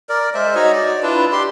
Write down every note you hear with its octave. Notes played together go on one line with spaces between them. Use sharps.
A#4 D5
G#3 C5 E5
D#4 F#4 C#5 D#5
D5
D4 E4 F4 B4
G4 C6